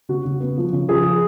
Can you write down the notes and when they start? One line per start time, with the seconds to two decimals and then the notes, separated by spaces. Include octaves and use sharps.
0.09 C#3 F#4
0.25 C#3
0.40 B3
0.57 F3
0.73 C#3
0.88 F3 G#4
1.05 F3